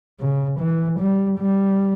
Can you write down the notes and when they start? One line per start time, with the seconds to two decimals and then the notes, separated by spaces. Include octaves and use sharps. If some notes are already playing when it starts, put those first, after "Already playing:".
0.20 C#3
0.60 E3
0.99 G3
1.39 G3